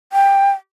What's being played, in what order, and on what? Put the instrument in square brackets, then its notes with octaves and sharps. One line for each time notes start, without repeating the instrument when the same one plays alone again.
[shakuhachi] G5